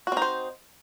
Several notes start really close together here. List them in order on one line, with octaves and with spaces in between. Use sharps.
F#4 C4 D#4 C5